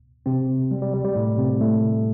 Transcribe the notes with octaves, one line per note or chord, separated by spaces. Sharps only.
C3 C4
G3
G3
G3
G3
A2 A3
C3 C4
A2 A3